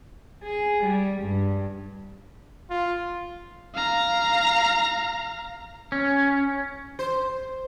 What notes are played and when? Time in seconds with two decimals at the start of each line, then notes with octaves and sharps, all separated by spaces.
0.44 G#4
0.83 G3
1.21 G2
2.70 F4
3.75 F5 A#5
5.92 C#4
6.99 C5